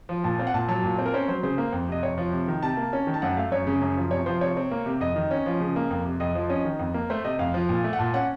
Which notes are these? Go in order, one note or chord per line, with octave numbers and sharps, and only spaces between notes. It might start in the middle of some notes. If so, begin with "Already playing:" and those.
F3
A#2 A5
C4 F5
F#5
A#2 A5
F#3 A5
A#2
C4
A#4
C#4 C5
F#3 C5
C#3 C5
A#3
F2
C3 D#5
F2 C#5
F3
C3
D#3
C3 A5
A#3
C#4
D#3
A5
F#2 F#5
A3 F5
F#2 C#5
C#3
F#2
F3
C3 C#5
F3 C5
C3 C#5
C4
A#3
C3
F2 D#5
D#3
C#4
F3
C#3
A#3
F2
C3
F2 D#5
F3
C#4 D#5
D#3
F2
A#3
A3 C5
C3 D#5
F2 F5
F3
A#2
A3
F#5
A#2 A5
C#4 F#5